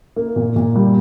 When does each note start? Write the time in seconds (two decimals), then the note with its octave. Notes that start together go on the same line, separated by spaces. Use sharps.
0.16 A#3
0.36 A#2
0.56 A#2
0.76 G3